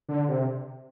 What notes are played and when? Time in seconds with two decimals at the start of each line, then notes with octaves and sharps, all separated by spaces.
0.09 D3
0.29 C3